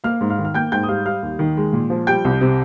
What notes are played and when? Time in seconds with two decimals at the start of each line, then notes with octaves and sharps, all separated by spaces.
0.04 A#3 F5 F6
0.21 G#2
0.29 F5 F6
0.39 D#3
0.45 F6
0.54 A#3 G5 G6
0.72 G#2 G5 G6
0.83 D#6
0.88 G3 F5 F6
1.05 G3 F5 F6
1.23 D#2
1.39 D#3
1.57 G#3
1.73 A#2
1.90 F3
2.07 G3 G5 G6
2.25 C2
2.41 C3